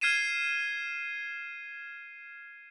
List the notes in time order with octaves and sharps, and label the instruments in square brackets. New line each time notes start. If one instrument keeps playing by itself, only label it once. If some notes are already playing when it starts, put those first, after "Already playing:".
[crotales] F6 G#6 C7 D#7 E7